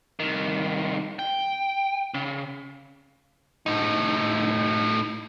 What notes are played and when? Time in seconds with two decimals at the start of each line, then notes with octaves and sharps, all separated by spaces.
0.20 C2 D#3
1.19 G5
2.14 C#3
3.66 A2 D#4